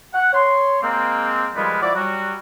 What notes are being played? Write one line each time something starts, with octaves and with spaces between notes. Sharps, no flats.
F#5
C#5 C6
G#3 A#3 C4
D#3 F3 G3 G#3 F4 B4
F3 E4 F#4 D5
F#3 G3 F#4